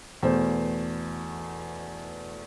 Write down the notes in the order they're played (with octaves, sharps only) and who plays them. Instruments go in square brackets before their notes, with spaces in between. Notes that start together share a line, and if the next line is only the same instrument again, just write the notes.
[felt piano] E2 B2 A3 C5